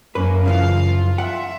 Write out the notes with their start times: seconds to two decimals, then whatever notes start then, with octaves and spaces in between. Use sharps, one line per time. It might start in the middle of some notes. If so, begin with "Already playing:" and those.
0.15 F#2 A#3 C#4 B4
0.46 C#3 E3 F3 F5
0.86 F4
1.18 E5 F#5